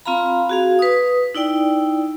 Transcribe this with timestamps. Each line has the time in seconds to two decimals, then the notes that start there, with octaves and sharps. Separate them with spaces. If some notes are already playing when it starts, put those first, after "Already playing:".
0.06 C4 F4 F5 A#5 B5
0.49 F#4 G#4 F5
0.79 B4 D#6
1.35 D#4 E4 D5 G5